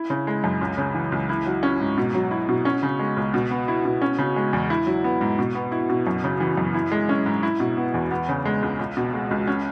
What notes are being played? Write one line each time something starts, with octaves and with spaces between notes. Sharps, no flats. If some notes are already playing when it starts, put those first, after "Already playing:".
Already playing: E4
C#3
G#3
F#2
C#2
C#3
E3
C#2
E4
F#3
C#4
G#2
B2
F#3
E4
B2
C#4
C#3
G#3
C#2
B2
B3
E4
B2
C#4
C#3
G#3
E2
E4
F#3
B3
G#2
B2
B3
E4
B2
F#2
C#3
E3
F#2
E4
G#3
C#4
G#2
E4
B2
B3
E2
B3
C#3
G#3
C#2
C#2
B2
G#3
C#2
C#4